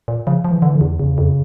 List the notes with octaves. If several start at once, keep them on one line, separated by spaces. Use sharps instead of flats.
A#2
C#3 F3
F3
E3
D3 E3
D3
E2
E2 C#3
F2